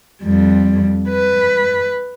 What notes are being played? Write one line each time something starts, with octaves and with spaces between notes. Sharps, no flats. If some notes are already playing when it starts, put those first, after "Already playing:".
F2 G3
B4